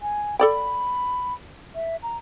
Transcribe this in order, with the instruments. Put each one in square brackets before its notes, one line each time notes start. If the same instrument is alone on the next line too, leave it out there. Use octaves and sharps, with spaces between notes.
[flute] G#5
[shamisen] A4 D5 G5 [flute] B5
[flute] E5
A#5